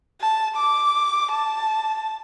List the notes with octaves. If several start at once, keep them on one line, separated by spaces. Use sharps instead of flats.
A5
D6
A5